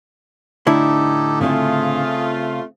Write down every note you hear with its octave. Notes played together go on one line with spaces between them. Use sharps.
A2 D3 D#4 E4 G4 A4
C#3 A3 C4 F4 G#4